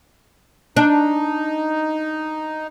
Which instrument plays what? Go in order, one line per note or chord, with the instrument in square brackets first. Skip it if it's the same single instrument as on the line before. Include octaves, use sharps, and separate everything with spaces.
[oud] D4 [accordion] D#4